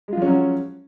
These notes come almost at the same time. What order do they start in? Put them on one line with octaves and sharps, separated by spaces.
G#3 F4 F3 C#4 F#3